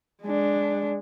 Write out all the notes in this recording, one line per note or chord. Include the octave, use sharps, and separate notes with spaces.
G#3 D4